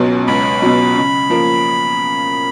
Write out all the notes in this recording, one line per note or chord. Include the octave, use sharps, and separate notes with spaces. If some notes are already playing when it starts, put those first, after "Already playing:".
Already playing: C#2 B2 F#3
C#2 B5
B2 F#3
C#3
F3 A#3